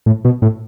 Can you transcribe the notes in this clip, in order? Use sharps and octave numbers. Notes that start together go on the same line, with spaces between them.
A2
B2
A2